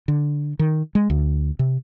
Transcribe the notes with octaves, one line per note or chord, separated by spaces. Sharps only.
D3
D#3
G#3
D2
C3